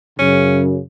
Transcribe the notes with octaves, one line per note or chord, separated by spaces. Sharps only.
F#2 C#3 C#4